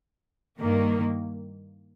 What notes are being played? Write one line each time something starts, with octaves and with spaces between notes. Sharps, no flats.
G2 D#3 A#3